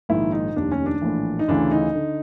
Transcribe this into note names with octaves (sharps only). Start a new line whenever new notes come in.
A#1 G#2 D#3 E4
D#4
F1 D#2 D#3 D4
C#4
D4
A#1 A2 E3
D#4
D2 C#3 E3 D4
D#4
D3